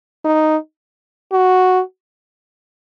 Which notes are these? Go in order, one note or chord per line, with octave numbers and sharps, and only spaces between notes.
D#4
F#4